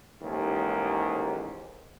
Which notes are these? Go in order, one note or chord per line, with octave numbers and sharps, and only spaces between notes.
A1 D#2 G#2